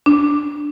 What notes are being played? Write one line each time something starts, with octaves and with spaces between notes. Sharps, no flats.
D4